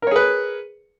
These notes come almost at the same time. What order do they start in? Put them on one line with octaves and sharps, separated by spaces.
A#4 C#5 G#4 B4